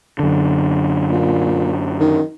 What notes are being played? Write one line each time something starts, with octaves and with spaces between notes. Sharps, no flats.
F#2 D3
A#2
D#3